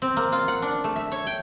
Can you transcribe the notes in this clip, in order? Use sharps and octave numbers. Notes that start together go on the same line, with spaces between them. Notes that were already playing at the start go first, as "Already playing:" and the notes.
C4
A#3
F4
F#5
D4
A3
E5
C#5
G5